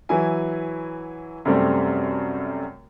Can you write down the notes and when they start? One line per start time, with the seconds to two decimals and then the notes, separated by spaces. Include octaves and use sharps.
0.09 E3 F#3 E4 G#5
1.45 F#2 C3 G3 A3 C4